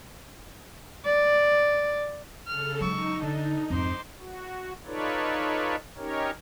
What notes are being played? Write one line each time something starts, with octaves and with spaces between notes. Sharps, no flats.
D5
C#3 A4 F6
F#3 G#3 D#4 C#6 E6
D3 D4 A4
F2 G#2 C5 D6
F#4
D#4 F4 A4 B4 C#5 D5
C#4 D#4 G4 A#4 C#5